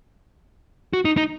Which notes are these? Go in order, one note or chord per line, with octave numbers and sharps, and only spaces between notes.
F#4
D#4
D#4